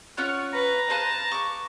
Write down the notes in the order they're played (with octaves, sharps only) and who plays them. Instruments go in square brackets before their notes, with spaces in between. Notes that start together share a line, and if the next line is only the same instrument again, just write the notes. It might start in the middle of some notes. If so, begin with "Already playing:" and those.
[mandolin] C#4 F4 C#5 [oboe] F#5
[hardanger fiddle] B4 [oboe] A#5
[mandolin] B4 C5 F5 [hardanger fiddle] A5
[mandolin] C#6 D6